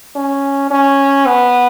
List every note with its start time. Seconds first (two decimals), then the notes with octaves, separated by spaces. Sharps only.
0.16 C#4
0.71 C#4
1.27 B3